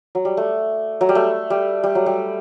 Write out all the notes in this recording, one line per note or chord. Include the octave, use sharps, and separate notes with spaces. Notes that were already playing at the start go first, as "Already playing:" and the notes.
F#3
G3
A3
F#3
G3
A3
G3
G3
F#3
G3